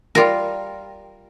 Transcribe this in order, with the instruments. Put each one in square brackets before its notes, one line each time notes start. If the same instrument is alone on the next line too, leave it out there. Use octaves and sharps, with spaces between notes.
[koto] G3 F4 A#4